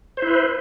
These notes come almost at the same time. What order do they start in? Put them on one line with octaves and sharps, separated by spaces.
C5 E4 B4